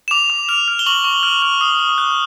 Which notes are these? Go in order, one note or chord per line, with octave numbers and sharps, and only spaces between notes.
E7
D6 F7
D6
F6 F7
F6
G7
C#6 F#7
C#6
F6
F6
D#6
D#6
F#6